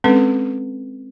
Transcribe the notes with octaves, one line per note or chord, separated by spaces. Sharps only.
G#3 C4 C#4 A4 B4